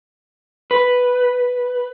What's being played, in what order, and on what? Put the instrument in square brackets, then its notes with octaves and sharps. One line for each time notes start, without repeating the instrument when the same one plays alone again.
[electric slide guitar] B4